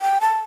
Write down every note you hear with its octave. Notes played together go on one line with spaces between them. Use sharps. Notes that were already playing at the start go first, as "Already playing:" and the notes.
G5
A5